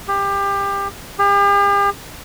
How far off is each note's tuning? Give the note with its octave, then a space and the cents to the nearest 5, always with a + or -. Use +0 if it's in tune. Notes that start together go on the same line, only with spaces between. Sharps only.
G4 +25
G4 +45